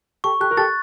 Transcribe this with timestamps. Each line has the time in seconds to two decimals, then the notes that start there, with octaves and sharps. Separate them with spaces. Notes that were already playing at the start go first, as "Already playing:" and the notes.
0.24 G4 A4 C#6
0.40 G4 A4 F#6
0.51 A#4
0.57 G4 A4 A6